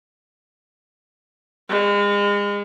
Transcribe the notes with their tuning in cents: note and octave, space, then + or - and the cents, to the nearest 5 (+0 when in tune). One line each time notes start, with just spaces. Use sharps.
G#3 -35